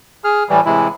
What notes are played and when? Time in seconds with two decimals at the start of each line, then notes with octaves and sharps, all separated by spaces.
0.24 G#4 F6
0.49 A2 E3 G3
0.65 A2 C3 E3 G#3 E4